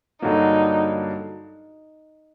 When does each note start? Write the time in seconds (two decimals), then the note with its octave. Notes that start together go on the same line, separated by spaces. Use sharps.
0.22 G2 D3 F#3 A#3 D#4